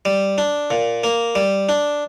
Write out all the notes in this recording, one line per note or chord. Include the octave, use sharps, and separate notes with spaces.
G3
D4
A#2
A#3
G3
D4